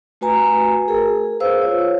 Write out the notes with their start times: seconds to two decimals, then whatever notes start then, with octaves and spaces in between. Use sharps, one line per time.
0.21 A3 F#4 B4 G#5 A#5
0.88 G#4 A#4
1.40 B4 C5 F5 E6
1.62 F4 C#5